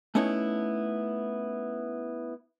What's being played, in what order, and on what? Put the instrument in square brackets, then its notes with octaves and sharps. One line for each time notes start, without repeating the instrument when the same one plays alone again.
[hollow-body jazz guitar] A3 B3 C#4 D#4 E4 C#5